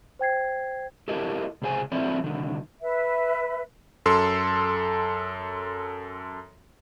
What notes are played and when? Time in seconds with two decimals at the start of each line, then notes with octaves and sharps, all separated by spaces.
0.19 C5 G5 G#6 C7
1.08 E4 G4 A4 A#4 D#5
1.62 C#2 C3 G#4 C5 G#5
1.92 F3 C4 E4 A4 C#5 D5
2.24 C2 D3 D#3
2.81 B4 E5
4.06 F#2 A4 A5 C6